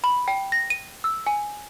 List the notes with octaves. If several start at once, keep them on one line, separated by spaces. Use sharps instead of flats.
B5
G5
A#6
D#7
E6
G#5